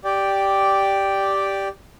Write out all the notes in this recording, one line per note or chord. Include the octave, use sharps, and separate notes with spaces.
G4 D5 G5